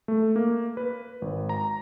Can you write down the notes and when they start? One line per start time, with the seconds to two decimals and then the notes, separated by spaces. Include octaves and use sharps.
0.08 A3
0.36 A#3
0.77 B4
1.22 G#1
1.49 A#5